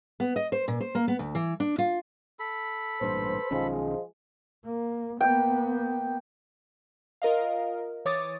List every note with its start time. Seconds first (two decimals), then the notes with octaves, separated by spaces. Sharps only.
0.20 B3
0.36 D#5
0.52 C5
0.68 A#2
0.80 C5
0.95 A#3
1.08 B3
1.19 D2
1.35 E3
1.60 D4
1.78 F4
2.39 A4 B5
3.01 A1 G2 A#2 B4 C5
3.51 B1 D#3 F3 G#3 C#4
4.64 A#3
5.21 A#3 B3 G5
7.22 F4 A#4 D#5 F5
8.05 E3 C#5 D6 D#6 A6